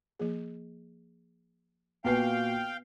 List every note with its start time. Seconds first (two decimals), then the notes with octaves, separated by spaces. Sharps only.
0.19 F3 A#3 G#4
2.05 A#2 B3 F#4 B4 F5 G5 G#5 C7